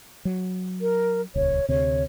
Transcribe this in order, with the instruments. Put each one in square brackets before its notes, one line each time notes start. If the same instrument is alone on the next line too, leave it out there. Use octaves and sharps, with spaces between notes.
[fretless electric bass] F#3
[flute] A#4
[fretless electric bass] D#1 C#2 [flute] C#5
[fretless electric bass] D2 C3 [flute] C#5